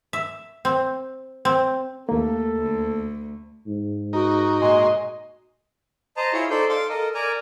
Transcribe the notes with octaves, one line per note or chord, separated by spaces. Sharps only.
E5
C4
C4
D#2 A3 A#3 A4
D2
G#2
D#4 F#4 A#4
A#2 G#3 D#5 C6
C5 D#5 A5 A#5
E4 F4 G#4 C#5
D#4 A4 C5 D5 G6
A4 F5 C6 D6
A4 A#4 D#5
A#4 D5 G#5 A#5